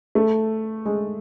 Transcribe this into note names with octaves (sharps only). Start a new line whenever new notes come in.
A3
G#3